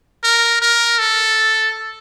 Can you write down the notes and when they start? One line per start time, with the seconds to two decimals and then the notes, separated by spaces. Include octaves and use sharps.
0.24 A#4
0.62 A#4
0.99 A4